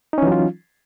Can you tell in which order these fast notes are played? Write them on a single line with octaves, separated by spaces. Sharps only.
D#4 C#4 E3 F#3 F4